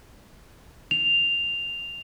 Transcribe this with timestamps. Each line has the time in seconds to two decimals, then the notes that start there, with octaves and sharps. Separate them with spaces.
0.91 F7